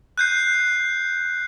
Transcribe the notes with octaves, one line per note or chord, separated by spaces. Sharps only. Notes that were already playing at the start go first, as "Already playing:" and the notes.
F#6 G6 C7